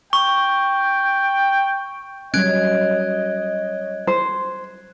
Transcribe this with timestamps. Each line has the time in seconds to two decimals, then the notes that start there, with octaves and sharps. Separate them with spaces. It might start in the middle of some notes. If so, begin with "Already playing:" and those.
0.13 G5 C#6
2.34 F#3 G3 C#4 C#5 D#5 F#6 G#6 D7
4.07 C5